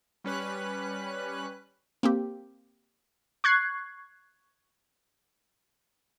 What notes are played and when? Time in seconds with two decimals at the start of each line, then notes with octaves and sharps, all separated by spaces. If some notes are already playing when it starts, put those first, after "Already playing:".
0.24 G3 C#4 B4 F#6
2.03 A#3 C4 G4
3.44 C#6 F#6 G#6 C7